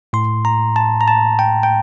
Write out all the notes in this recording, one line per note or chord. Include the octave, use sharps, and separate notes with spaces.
A2 C6
A#5
A5
A#5
A5
G5
G5